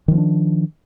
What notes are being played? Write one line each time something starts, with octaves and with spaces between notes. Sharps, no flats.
D#3 F3 A#3 D4